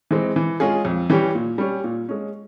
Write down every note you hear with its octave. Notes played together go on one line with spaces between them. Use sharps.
E3 G#3 C4
E3
G#3 C#4 F4 G#4
F2
E3 G3 C#4 G4
A#2
G3 C#4
A#2
G#3 C#4